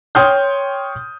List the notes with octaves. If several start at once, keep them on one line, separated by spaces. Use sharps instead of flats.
C#5 G5 C6 D#6 F6 G6